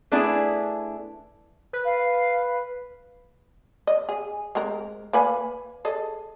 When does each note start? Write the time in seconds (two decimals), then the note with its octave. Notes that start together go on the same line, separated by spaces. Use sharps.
0.12 A3 B3 D4 E4 G#4
1.73 B4
1.85 F5
3.87 D#5
4.09 G#4
4.55 G#3 C4 A#4
5.13 A#3 B4 G#5
5.85 G#4 A4 D#5